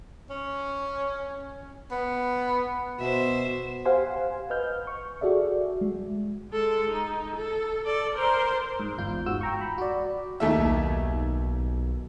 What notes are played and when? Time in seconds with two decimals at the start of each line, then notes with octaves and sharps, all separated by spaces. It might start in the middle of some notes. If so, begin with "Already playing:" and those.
0.30 C#4
1.92 B3
2.99 B2 C5 E5
3.85 G4 C5 F5 F#5 G#5 C6
4.50 B4 D#5 F6 G6
4.87 C#6
5.21 F#4 G#4 A4 D5 E5
5.81 G#3
6.51 G#3 A4
6.90 D#4
7.35 A4
7.84 A4 D5
8.14 A#4 C5
8.80 G#2
8.98 G1 E2 F4 G6
9.26 G#2 F#4 E6
9.41 G5 A#5 C#6
9.61 B5
9.78 F#4 D5
10.40 D#2 A3 E5
10.58 B1